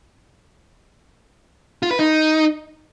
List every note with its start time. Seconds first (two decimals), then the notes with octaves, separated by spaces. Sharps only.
1.83 F4
1.91 B4
1.99 D#4